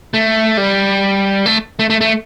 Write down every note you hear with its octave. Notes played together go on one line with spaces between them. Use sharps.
A3
G3
A3
A3
A3
A3